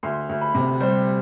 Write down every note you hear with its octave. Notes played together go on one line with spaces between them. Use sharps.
D2 C6
D2
B5
C3
G3 C5